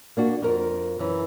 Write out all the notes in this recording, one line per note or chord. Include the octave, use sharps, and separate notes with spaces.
A#3 D4 F#4
F2 A#4
F#2 E3